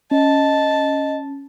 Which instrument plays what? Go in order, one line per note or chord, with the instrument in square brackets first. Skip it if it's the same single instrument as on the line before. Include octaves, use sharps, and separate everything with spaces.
[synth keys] C#4 [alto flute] D#5 [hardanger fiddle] A5